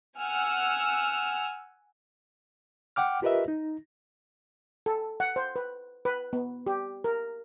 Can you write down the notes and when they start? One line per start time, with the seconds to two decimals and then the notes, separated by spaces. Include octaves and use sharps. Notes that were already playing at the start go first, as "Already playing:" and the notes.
0.20 F#5 G#5 E6 F6
2.96 F#5 G5 D6 F6
3.22 F4 G4 A#4 B4 D#5 E5
3.48 D#4
4.86 A4
5.20 F#5
5.36 C5
5.56 B4
6.05 B4
6.33 B3
6.67 G4
7.04 A#4